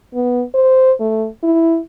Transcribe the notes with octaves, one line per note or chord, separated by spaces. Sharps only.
B3
C5
A3
E4